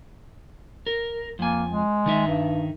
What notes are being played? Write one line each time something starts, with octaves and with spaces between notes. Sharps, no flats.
A#4
F2 A#3 G#5
G#3
D#3 D#4 E5
G2